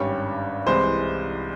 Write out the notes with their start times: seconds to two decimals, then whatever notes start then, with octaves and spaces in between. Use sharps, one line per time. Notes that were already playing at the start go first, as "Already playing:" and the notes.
Already playing: G#1 G2 G3 C#4 C#5
0.66 C2 C3 E3 G#3 C5